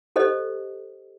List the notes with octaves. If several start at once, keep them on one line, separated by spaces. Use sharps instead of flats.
G4 A4 C5 D#5